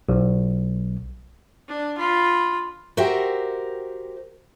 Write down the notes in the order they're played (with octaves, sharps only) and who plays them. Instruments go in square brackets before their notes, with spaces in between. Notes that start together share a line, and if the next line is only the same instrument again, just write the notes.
[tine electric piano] B1
[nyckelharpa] D4
F4 B5
[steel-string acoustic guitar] F#4 G4 A#4 C5 E5 G5